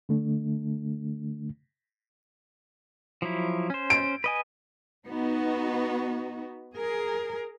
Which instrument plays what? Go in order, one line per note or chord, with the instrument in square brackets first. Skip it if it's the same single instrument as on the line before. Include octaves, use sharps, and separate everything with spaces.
[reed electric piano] D3 A3 D4
[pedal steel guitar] F3 F#3 E4
C#4 C5
[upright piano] D7
[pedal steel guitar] B4 D#5 G#5
[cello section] B3 D#4 F#4
G#4 A#4